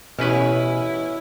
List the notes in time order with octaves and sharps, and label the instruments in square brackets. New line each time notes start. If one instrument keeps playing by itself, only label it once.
[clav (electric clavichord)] A1 B4 [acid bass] B2 [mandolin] C#4 G#4 C#5 [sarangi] E4